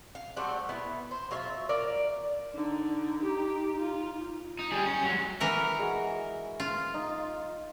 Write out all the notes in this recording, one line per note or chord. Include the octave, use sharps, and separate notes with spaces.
F5
G3 A3 C4 F#4
B3 E4
C5
F#3 F4 E5
A#4 D5 F5
D3 D#4
G4
F4
D#4
G3 G#4
C#4
F#3 G#3
E3 A#4 F#5
G#3 F#4
F4
D#4